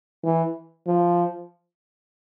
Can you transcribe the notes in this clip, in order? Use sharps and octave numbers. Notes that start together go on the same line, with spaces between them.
E3
F3